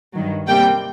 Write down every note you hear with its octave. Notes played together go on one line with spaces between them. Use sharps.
G2 D#3 F#3
C3 G3 A#3 G5